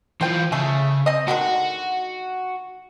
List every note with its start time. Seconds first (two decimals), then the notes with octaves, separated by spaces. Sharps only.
0.21 E3 F4 C5 G5
0.52 C#3 A3 G#4
1.06 C4 D#5
1.28 D3 D#3 G#3 F#4